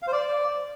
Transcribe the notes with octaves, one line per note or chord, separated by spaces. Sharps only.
F5
C5
D5